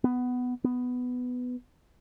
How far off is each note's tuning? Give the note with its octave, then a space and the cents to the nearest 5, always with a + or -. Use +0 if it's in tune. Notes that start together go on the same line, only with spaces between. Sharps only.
B3 +10
B3 +10